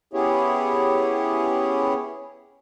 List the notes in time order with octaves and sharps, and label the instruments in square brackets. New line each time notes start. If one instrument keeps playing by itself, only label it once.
[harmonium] B3 C#4 E4 G4 G#4 C#5